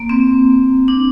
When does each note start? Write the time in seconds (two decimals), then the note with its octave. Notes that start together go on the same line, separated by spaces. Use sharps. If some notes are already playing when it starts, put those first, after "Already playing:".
Already playing: A#3
0.09 C4
0.88 D4